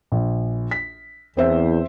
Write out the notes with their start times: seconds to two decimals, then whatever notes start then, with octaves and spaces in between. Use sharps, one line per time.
0.12 A#1
0.71 B6
1.37 E2 C4 C5 E5